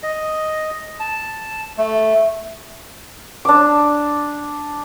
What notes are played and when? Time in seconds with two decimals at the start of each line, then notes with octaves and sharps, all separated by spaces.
0.03 D#5
1.00 A5
1.78 A3
3.45 D4 D6